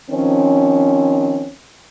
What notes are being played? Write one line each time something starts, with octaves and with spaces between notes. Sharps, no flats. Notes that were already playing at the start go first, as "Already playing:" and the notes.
D#3 F3 C4 C#4